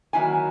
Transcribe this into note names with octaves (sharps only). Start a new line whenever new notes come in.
D#3 F#3 A#3 E4 G#5